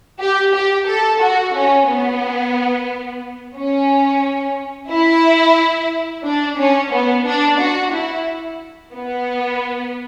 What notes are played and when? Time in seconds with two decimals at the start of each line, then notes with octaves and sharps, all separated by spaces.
0.19 G4
0.53 G4
0.87 A4
1.20 F#4
1.54 C#4
1.88 B3
3.56 C#4
4.90 E4
6.24 D4
6.58 C#4
6.91 B3
7.25 D4
7.58 F#4
7.92 E4
8.93 B3